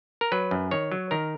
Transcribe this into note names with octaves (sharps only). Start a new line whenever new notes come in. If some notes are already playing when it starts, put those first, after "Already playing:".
A#4
F#3 B4
F#2
D#3 C#5
F#3
D#3 A#4